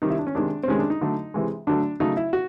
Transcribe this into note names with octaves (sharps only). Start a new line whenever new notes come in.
C3 D#3 G3 D#4
E4
D4
C#4
C3 D#3 G#3 D4
C4
C3 D#3 G#3 C#4
D4
D#4
D3 F#3 A3
C3 E3 G#3
D3 F#3 A3 D4
C#3 F#3 A3 D#4
E4
F#4